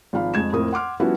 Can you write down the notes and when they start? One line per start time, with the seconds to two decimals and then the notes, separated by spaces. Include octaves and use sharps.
0.13 G#1 F3 F5 B5
0.34 F2 G#3 G#6 E7
0.52 F2 A2 C4 A#4 D#6
0.73 F#5 C6 D6 F6
1.00 F3 G3 B3 C#4 E4 F#4